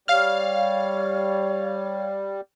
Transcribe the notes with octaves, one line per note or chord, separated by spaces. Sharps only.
G3 C#5 F5 F6